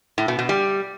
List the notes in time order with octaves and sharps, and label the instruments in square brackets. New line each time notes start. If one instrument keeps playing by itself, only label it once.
[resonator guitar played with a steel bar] A2
B2
B2
G3